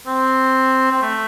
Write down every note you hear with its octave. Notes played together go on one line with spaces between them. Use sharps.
C4
C4
A3